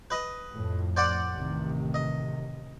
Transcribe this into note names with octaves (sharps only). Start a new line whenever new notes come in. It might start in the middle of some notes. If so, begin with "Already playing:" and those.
B4 D#5
F2 A2
C5 D5 F#5
A1 C3 D#3
D#5